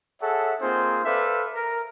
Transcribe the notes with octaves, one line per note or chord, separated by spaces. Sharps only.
G#4 A4 C#5 E5 F#5 A5
A#3 C4 D#4 F4 G#4 C5
A4 B4 C5 D5 E5 F5
A#4